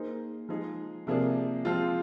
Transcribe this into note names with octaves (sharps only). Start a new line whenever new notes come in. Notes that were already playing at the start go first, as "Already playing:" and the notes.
Already playing: A#3 D#4 G#4 C5
F3 G#3 D#4 G#4
C3 F3 A#3 D4 G#4
F3 G#3 C4 F4